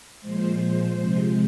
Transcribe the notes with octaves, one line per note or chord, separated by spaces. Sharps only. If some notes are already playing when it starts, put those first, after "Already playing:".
A#2 F3 G#3 C5
C5
C3 F3 G#3